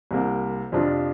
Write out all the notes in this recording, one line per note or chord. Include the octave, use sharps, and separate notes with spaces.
C2 C3 A#3
F2 C3 F3 D4 F4